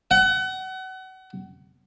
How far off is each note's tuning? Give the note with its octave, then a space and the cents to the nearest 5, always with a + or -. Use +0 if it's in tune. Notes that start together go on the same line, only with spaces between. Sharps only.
F#5 +30